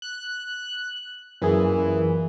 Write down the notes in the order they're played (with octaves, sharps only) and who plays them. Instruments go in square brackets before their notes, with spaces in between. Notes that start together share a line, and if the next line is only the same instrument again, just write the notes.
[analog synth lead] F#6
[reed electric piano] F#2 G#4 [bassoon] A#2 [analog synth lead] E3